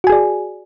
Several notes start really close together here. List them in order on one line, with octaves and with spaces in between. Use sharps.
F#4 G#5 G#4 D5